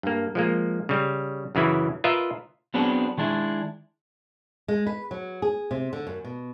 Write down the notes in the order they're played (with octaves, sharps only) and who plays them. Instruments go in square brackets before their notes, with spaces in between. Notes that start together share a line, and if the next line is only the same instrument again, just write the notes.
[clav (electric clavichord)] G2 A#3
F3 G#3 A#3
C#3 G3
F#2 C#3 E3 E4
F4 A#4 B4 D#5 E5
[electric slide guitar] F#3 B3 C4 D4 G#4
D#3 G#3 D4 E4
[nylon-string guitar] G#3
B4
F#3
G#4
C3
D3
F#2
B2